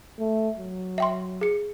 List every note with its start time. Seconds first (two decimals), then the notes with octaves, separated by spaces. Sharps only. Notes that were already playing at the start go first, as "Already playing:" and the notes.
0.20 A3
0.58 F#3
0.98 E5 G5 C6
1.41 G#4 C#7